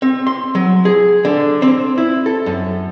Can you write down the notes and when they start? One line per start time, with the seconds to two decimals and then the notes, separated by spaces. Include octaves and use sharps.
0.02 C4
0.27 C6
0.55 F#3
0.85 G#4
1.25 D3
1.62 C4
1.98 E4
2.26 A4
2.46 F#2